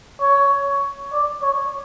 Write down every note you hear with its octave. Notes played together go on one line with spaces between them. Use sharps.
C#5
D5
C#5